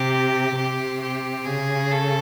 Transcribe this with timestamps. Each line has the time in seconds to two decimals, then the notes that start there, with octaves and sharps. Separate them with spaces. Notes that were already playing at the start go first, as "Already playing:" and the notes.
Already playing: C3 G4
0.57 C3 G4
1.02 G4
1.45 C#3 G#4
1.91 A4